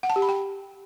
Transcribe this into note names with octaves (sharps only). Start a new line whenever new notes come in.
F#5
A5
G4
B5
G5